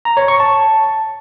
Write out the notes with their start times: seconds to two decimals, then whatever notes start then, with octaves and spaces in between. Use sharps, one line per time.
0.05 A#5
0.17 C#5
0.28 C#6
0.40 A5